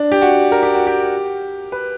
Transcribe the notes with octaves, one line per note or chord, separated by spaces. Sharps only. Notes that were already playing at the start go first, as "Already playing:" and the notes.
Already playing: D4
G4
F#4
A#4
G4
F#4
G4
B4